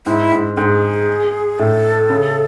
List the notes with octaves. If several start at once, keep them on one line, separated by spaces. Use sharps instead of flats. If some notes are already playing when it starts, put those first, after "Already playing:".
G#2 E4
G#2
G#2 G#4 A4
A2 A4
C#3